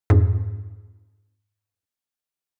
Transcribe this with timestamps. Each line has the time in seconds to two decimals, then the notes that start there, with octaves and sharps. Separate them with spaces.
0.10 F2 G#2